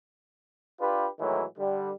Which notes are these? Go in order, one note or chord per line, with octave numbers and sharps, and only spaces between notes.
D4 F4 G4 B4
A2 D#3 E3 F#3 G#3
D3 G3